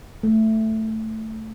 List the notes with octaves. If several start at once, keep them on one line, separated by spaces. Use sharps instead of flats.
A3